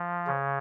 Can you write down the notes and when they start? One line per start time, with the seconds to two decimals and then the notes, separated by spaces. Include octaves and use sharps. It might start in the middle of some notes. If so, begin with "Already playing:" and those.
Already playing: F3
0.27 C#3